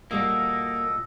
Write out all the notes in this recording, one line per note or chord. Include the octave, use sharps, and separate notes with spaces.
A#2 G3 A#3 F#4 A4 D#5